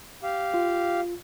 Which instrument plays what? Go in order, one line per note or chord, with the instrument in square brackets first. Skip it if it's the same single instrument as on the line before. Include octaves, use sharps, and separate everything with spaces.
[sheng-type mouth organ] G4 F5
[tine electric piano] F4